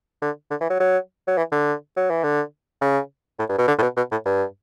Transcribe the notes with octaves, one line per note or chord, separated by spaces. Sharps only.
D3
D3
E3
F#3
F#3
F#3
E3
D3
F#3
E3
D3
C#3
A2
G2
B2
D3
A2
B2
B2
A2
G2